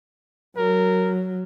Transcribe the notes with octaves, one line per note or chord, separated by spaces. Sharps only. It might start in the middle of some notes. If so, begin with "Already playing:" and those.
F#3 A#4